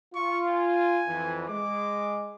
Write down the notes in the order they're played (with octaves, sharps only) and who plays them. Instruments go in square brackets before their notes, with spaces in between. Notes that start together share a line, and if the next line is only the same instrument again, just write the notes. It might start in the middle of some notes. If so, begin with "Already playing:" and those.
[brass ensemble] F4 [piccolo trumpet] C#6
[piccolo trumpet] G#5
[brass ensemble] F2 E3
[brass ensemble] G#3 [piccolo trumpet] D6